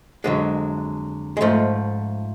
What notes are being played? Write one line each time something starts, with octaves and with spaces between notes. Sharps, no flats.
F2 D3 F#3 G#3
G#3
G#2 F3 A3